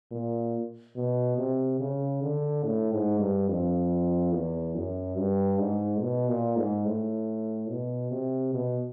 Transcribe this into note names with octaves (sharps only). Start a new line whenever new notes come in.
A#2
B2
C3
C#3
D3
A2
G#2
G2
F2
E2
F#2
G2
G#2
B2
A#2
G#2
A2
B2
C3
B2